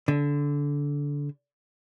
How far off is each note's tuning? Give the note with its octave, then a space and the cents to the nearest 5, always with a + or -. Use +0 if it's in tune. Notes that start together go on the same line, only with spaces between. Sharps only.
D3 -20